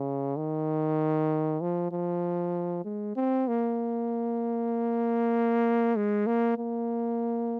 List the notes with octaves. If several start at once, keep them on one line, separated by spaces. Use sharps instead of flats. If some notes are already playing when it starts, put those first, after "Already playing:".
Already playing: C#3
D#3
F3
F3
G#3
C4
A#3
G#3
A#3
A#3